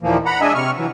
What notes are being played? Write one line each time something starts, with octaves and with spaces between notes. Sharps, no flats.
D#2 A#2 E3 F3 A#3
F#5 A#5 B5
G#3 D4 D#5 E5 G#5
C3 C#6 F6
E3 F#3